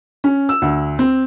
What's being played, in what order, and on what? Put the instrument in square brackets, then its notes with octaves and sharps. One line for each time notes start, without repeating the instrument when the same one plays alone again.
[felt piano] C#4
E6
D2
C4